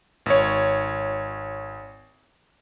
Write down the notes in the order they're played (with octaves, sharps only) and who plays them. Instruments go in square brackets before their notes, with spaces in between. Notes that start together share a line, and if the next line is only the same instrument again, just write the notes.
[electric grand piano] G#1 C#5